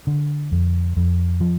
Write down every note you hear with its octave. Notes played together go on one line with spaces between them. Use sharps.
D3
F2
F2
F3